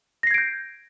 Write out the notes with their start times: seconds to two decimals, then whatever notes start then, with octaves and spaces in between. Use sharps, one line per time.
0.23 A#6
0.27 C7
0.31 G#6
0.34 D7
0.38 G6